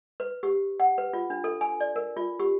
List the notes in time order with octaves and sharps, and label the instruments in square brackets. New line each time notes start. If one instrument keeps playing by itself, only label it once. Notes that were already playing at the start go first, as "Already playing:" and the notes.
[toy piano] B4
G4
F#5
B4
F4
D4
A4
G#5
D5
A#4
F4
G4